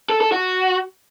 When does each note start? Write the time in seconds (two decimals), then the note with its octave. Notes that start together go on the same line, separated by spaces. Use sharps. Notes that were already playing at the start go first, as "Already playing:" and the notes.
0.09 A4
0.21 A4
0.32 F#4